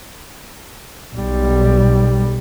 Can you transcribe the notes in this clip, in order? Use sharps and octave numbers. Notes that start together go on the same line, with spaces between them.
B1 G3